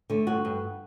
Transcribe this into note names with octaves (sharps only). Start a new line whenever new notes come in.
D3 A3
G2 F#4
G2